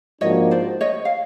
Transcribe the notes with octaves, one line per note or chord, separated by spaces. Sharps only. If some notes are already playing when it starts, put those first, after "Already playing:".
G#2 F3 A#3 D4 F#4 C#5 D#5
C5 D5
C#5 D#5
F5